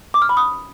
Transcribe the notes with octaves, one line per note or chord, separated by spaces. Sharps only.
D6
F6
B5
D#6